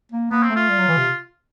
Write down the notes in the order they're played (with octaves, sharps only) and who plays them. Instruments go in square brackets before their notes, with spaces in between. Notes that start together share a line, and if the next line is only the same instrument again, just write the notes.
[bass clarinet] A#3
[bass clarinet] A#3 [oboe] B3
[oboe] C4
[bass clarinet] A3
[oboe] F4
[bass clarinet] G3
F#3
E3
C3